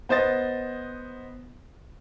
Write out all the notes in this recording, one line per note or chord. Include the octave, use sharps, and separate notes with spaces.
B3 C5 D#5 A6